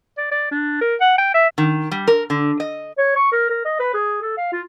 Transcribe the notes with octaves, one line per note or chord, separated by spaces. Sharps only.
D5
D5
D4
A#4
F#5
G5
E5
D#3
G3
A#4
D3
D#5
C#5
C#6
A#4
A#4
D#5
B4
G#4
A4
F5
F4